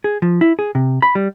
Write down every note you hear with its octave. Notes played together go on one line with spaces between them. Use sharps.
G#4
F3
E4
G#4
C3
B5
G3